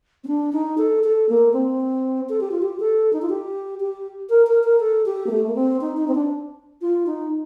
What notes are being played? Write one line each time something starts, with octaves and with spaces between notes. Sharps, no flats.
C4
D4
D#4
A4
A4
A#3
C4
A4
G4
F4
G4
A4
D#4
F4
G4
G4
A#4
A#4
A#4
A4
G4
A#3
A3
A#3
C4
D#4
D#4
C4
D4
F4
D#4